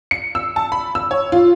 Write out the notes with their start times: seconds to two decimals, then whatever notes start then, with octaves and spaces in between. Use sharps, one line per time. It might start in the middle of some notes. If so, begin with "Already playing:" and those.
0.11 C#7
0.35 E6
0.56 A5
0.72 B5
0.95 E6
1.11 C#5
1.32 F4